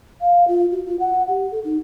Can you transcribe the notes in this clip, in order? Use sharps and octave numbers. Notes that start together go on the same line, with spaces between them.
F5
F4
F#4
F4
F#5
G4
A4
D#4